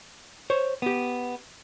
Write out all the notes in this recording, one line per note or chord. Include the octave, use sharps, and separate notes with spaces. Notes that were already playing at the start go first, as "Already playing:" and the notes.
C5 C#5
B3 G4